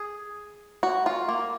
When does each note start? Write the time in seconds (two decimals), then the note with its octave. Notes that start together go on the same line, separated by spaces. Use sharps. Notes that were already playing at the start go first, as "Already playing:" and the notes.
Already playing: G#4
0.83 F#4
1.06 F4
1.28 A#3